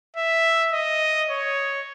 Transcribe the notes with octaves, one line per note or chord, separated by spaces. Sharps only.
E5
D#5
C#5